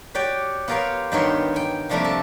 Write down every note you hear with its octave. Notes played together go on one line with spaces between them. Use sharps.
F#4 G4 C#5 D5 G5
B3 F4 G4 A#4 C#5 F5
G2 D#3 B3 A#4 C#5 C6
G5 G#5
C3 F3 G3 A3 A#3 D4
A4